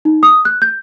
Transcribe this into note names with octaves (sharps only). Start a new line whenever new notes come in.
D#4
D#6
F#6
G6